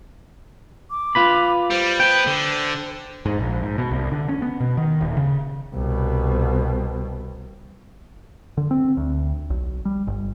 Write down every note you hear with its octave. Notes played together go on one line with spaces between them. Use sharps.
D6
F4 B4 B5
G3 C5
B3 B4 G5
D3
G#2
A#1
G#2
B2
C2
D3
C#4
B3
B2
D#3
D#1
C#3
C2 B2
D3
C4
D2
B1
G3
G1